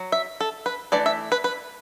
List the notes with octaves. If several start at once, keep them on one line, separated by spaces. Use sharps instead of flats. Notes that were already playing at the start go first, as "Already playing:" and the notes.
Already playing: F#3
E5
A4
B4
E3 A3 D4 D5
E5
B4
B4